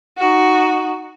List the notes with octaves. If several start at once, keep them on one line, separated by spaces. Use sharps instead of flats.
D#4 F#4